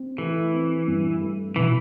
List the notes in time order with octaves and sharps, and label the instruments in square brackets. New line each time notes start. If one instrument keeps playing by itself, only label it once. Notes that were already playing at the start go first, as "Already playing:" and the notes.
Already playing: [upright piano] C4
[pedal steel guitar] E3 [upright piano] A3
[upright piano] C4
G2
A3
[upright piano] B2 [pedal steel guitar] E3